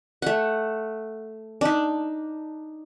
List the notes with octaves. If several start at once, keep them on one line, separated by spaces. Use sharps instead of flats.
A3 F#5
D4 D#4